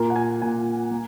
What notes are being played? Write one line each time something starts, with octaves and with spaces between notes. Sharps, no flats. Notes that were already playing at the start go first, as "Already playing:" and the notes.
Already playing: A#2 A#3 A#4
F#5
G#5
A#2 A#3 G#5
A#3